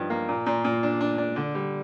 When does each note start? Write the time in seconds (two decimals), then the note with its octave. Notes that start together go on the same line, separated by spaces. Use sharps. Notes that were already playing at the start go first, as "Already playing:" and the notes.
Already playing: G2 F3 D#4
0.10 A#3
0.28 A#2
0.46 A#2
0.64 A#2
0.83 D4
1.01 D4
1.18 D4
1.36 D3
1.55 G3